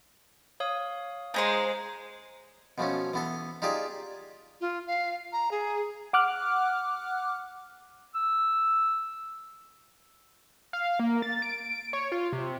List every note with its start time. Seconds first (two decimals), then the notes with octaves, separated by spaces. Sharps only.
0.60 C#5 F5 D#6
1.34 G#3 D#4 C5 A#5 C6
2.78 B2 F3 A3 C#4
3.14 E3 B3 A4
3.62 D#4 F4 G4 G#4 D5
4.61 F4
4.87 F5
5.33 A#5
5.51 G#4
6.13 F#5 D6 F6 F#6
8.15 E6
10.73 F5
11.00 A#3
11.22 A6
11.42 D7
11.71 D7
11.93 C#5
12.12 F4
12.33 C3